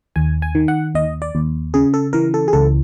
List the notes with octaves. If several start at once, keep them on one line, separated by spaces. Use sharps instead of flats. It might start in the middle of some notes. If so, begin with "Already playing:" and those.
D#2 G#5
G#5
D#3
F#5
D#2 D#5
D5
D#2
C#3 G#4
A4
E3 A#4
A4
G#4
C#2 A4